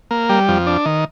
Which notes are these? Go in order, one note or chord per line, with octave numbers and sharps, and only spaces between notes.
A#3
G3
F2
D4
D#3